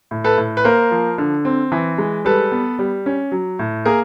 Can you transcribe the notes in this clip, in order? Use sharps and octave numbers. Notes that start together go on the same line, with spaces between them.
A2
A4 B4
A2
B4
A#3 A#4 C5
F3
D3
C4
E3
G#3
G3 A4 B4
B3
G3
C#4
F#3
A2
A#3 G#4 A#4